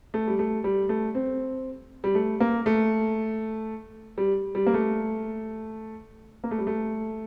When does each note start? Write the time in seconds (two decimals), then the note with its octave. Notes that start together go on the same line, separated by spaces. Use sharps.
0.14 A3
0.28 G3
0.39 A3
0.64 G3
0.89 A3
1.15 C4
2.04 G3
2.15 A3
2.40 A#3
2.66 A3
4.18 G3
4.55 G3
4.66 A#3
4.74 A3
6.44 A#3
6.51 A3
6.58 G3
6.67 A3